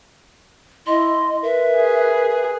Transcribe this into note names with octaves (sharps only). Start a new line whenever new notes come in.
E4 D#5 C6
A#4 B4 E5
G#4